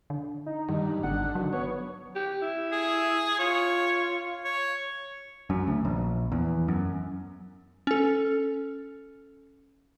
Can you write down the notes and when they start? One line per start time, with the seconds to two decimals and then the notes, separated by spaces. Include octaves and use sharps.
0.10 D3
0.46 D#4
0.69 G2 D#3
1.03 G#1 D3 F#5
1.35 D#3 F#3
1.53 B3 C#5
2.15 G4
2.42 E4
2.72 G#4
3.39 F4 C#5
4.45 C#5
5.50 F#2
5.67 D2
5.85 A#1
6.32 E2
6.68 F#2
7.87 C#4 A4